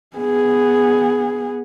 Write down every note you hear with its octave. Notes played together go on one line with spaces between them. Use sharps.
B3 G#4